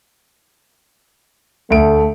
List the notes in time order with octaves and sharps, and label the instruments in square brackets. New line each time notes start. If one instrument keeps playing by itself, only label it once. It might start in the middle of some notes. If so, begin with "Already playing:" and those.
[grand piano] D2 D7 [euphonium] A3